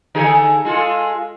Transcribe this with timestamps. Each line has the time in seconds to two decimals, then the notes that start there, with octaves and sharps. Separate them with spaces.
0.15 D3 G#4 A4
0.65 G#3 F4 A4